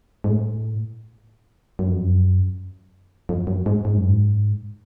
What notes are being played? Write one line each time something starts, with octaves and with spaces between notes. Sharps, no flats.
G#2
A2
F#2
F2
F#2
F2
F#2
G#2
G#2
F#2
G#2